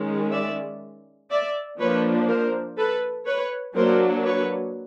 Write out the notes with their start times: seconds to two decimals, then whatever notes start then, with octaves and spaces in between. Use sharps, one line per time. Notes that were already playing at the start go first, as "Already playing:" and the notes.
Already playing: D#3 G#3 C#4
0.32 D5 E5
1.31 D5 E5
1.79 F3 A#3 D4 B4 C#5
2.28 A#4 C5
2.78 A4 B4
3.26 B4 C#5
3.76 F#3 A#3 D4 A#4 C5
4.25 B4 C#5